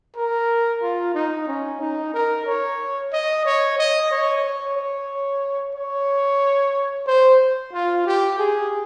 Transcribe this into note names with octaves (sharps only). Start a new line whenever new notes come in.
A#4
F4
D#4
C#4
D#4
A#4
C#5
D#5
C#5
D#5
C#5
C#5
C#5
C#5
C5
F4
G4
G#4